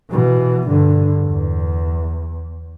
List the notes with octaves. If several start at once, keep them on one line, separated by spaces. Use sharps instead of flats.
B2 E3
G2 D3
E2